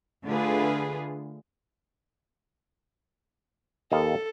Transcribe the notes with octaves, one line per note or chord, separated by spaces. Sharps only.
D3 A3 F4 G#4 B4
D#2 A4 D#5 F5